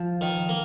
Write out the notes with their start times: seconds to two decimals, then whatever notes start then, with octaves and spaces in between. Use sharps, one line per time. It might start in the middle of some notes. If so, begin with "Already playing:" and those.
Already playing: F3
0.21 D#3
0.49 A#3